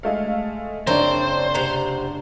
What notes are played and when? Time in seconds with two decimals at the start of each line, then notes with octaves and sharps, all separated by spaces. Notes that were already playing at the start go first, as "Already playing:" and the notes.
0.03 G#3 A3 F5
0.87 F#1 C4 D4 A#4 C5 C#5
1.54 C3 F#5 A#5